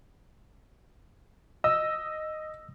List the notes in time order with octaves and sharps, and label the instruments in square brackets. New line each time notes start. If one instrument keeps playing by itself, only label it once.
[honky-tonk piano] D#5 [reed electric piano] E6